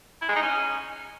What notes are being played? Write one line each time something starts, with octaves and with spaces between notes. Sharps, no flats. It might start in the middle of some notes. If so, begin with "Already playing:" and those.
E4
G#3
D#4
C#4